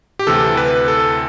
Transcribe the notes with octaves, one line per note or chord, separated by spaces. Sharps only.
G4
D2 C3 E3 A4
B4
A4